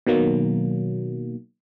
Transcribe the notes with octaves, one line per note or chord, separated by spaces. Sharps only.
B2 D#3 F#3 A#3